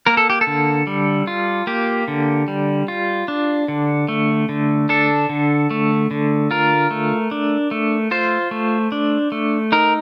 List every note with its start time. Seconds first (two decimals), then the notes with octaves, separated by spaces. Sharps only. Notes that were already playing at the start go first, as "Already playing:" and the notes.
0.06 A#3 A#4
0.17 A4
0.30 G4
0.41 A4
0.47 D3
0.87 G3
1.27 F4
1.67 A#3 G4
2.08 D3
2.48 G3
2.88 F4
3.28 D4
3.68 D3
4.08 A3
4.49 D3
4.89 D4 A4
5.29 D3
5.71 A3
6.11 D3
6.51 F4 A#4
6.91 A3
7.31 D4
7.71 A3
8.11 F4 C5
8.51 A3
8.92 D4
9.32 A3
9.72 D#4 A#4